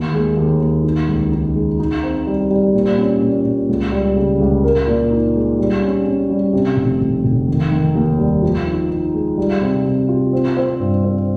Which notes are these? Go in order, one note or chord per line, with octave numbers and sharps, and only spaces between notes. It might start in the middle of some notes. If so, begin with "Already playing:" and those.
Already playing: D#2
G#3
D#2
D#2
D#4
C#2
D#4
G#3
D#4
C4
G3
G3
A#2
C#4
A#2
A#2
C#2
G3
C#3
C#2
A#4
A#2
D#4
G#3
G3
C#4
C#4
G3
C3
F1
F1
F1
D#3
D#3
D#2
G3
F3
D#4
D#4
G#3
G3
C3
C3
F4
C4
C4
G2
C4